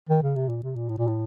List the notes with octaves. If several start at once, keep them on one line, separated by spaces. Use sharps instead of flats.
D#3
C#3
C3
A#2
C3
A#2
A2
A#2
A2